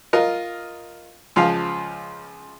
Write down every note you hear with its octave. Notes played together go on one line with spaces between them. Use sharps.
F4 A#4 D#5
C#2 F3 F5